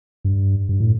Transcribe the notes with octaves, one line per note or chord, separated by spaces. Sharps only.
G2
G2
A2